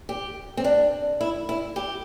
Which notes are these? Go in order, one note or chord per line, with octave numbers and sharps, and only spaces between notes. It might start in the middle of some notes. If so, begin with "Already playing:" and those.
G4
C4
D4
E4
E4
G4